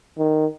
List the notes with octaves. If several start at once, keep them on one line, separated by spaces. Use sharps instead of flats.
D#3